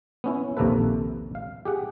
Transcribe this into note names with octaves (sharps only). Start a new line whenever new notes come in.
B3 C#4 E4
A#1 D#2 C3 A#3 A4 B4
F5
G4 G#4 F#5